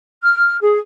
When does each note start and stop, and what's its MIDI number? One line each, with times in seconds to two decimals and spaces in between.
0.21 0.55 89
0.60 0.77 68